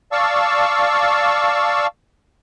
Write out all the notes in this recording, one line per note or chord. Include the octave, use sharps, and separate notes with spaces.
D5 F5 A5 C#6 E6